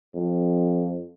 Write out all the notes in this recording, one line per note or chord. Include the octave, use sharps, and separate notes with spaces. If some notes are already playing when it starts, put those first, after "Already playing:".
F2